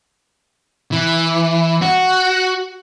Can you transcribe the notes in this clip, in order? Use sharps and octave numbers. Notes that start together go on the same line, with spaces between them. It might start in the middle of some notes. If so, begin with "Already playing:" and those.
E3
F#4